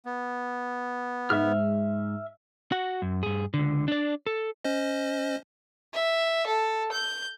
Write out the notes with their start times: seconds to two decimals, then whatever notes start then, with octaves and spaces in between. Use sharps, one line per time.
0.05 B3
1.30 G#2 E5 F6
2.72 F#4 F#5
3.02 F#2
3.23 G2 G#4
3.54 C#2 D3
3.88 D4 D5
4.27 A4
4.64 C#4 C5 D#5
5.94 E5
6.47 A4
6.92 G6